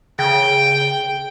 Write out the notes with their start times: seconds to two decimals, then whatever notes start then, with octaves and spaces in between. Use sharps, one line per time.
0.19 C#3 G5